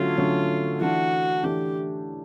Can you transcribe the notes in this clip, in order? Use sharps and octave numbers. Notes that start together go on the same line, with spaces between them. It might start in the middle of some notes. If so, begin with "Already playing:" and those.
Already playing: D3 F#3 A3 C#4 F4 F#4
D3 F#3 A3 C#4 F#4
E3 A3 D4 F#4
E3 A3 D4 G4